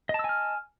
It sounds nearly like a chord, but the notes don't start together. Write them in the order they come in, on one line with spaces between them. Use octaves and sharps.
D#5 A5 E6 G#5 F6